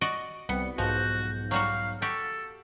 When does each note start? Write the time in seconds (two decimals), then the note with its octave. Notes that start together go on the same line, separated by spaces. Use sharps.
0.01 F#4 D5 D#5
0.49 C2 G3 B3 C#7
0.78 B1 G#2 F3 F#4 G6
1.51 F#3 G3 F#4 F5
2.02 F#4 G4 A4